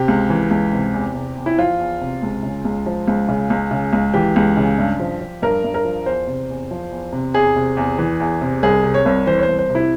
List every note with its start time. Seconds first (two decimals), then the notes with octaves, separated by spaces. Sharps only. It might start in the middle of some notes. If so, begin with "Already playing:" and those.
Already playing: C3 G4
0.08 C#2
0.30 E3
0.51 C#2
0.73 C3
0.94 E2
1.15 C3
1.36 E2
1.46 E4
1.58 F3 F4
1.79 E2
2.01 C3
2.23 C#2
2.43 C#3
2.65 C#2
2.86 F3
3.08 C#2
3.29 C#3
3.50 C#2
3.71 C#3
3.93 C#2
4.14 E3 G4
4.36 C#2
4.57 C#3
4.78 G2
5.00 F3
5.21 F3
5.42 G2 A#4
5.64 G2
5.74 A#4
5.85 F3
6.06 E2 C5
6.27 C3
6.50 E2
6.71 F3
6.91 E2
7.13 C3
7.34 E2 G#4
7.56 C3
7.77 E2
7.99 E3
8.20 E2
8.41 C3
8.63 C2 G#4
8.83 C3
8.94 C#5
9.06 C2
9.27 E3 C5
9.38 C#5
9.43 C5
9.48 C2
9.59 C5
9.70 C3
9.75 E4